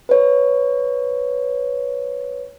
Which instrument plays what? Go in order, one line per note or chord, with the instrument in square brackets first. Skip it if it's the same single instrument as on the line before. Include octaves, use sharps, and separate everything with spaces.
[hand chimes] B4 C#5